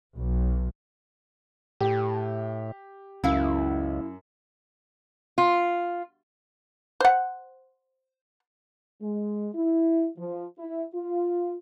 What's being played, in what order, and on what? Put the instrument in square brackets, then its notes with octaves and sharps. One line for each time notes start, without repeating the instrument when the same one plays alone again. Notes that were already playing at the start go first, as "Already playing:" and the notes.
[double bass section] B1
[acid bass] A2 [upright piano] G4
[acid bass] C#2 [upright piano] F#2 [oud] E4 F5
[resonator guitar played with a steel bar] F4
[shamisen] C5 F#5
[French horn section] G#3
E4
F3
E4
F4